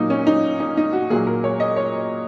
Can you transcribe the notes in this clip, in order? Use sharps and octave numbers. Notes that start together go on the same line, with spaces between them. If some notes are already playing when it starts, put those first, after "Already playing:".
Already playing: A#2 F#3 A#3 D#4
C#4
D#4
D#4
D#4
F#4
A#2 F#3 A#3 G#4
A#4
C#5
D#5
C#5